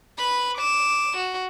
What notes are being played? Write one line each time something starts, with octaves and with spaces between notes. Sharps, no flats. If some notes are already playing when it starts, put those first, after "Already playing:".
B4 B5
D6 E7
F#4